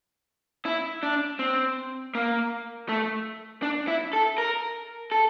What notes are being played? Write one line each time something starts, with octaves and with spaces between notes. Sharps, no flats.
E4
D4
C4
A#3
A3
D4
E4
A4
A#4
A4